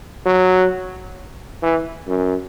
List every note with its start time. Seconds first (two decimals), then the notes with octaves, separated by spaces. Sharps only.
0.26 F#3
1.63 E3
2.07 F#2